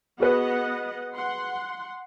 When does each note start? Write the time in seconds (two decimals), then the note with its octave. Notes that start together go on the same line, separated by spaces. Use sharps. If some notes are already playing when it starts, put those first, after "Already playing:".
0.20 B3 F#4 G#4 B4 D#5 F#5
1.15 F#5 C6